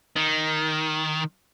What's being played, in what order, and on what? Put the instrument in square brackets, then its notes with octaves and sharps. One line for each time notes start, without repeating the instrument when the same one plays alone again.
[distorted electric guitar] D#3